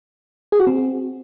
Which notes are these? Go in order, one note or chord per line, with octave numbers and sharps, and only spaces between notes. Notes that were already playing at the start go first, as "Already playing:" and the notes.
G#4
F#4
C4